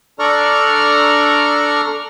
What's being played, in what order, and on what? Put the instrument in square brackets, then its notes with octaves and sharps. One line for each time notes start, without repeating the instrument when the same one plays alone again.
[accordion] D4 A4 D5 A#5 C#6 F6